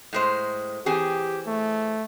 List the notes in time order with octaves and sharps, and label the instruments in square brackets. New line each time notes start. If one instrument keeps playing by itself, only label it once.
[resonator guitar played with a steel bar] A2 G#3 C5
[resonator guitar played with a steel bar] E3 C4 G#4 [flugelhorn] G4
[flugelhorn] A3